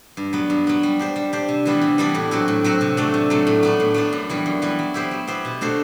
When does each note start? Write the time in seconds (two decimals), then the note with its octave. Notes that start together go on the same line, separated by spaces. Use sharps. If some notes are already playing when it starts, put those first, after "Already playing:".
0.17 G2
0.33 F#3 B3
0.50 G2
0.67 F#3 B3
0.83 G3
0.99 D4 G4 C5
1.16 G3
1.33 D4 G4 C5
1.48 C3
1.65 E3 G3 B3 D4
1.81 C3
1.98 E3 G3 B3 D4
2.14 A2
2.31 F#3 C4 F#4
2.48 A2
2.64 F#3 C4 F#4
2.81 C3
2.97 F#3 A3 D4
3.14 C3
3.30 F#3 A3 D4
3.47 A2
3.63 F#3 B3 D4
3.80 A2
3.94 F#3 B3 D4
4.13 F#2
4.29 E3 G3 B3
4.46 F#2
4.62 E3 G3 B3
4.79 F#3
4.94 B3 E4 G4 C5
5.11 F#3
5.27 B3 E4 G4 C5
5.45 B2
5.61 A3 D4 F#4 C5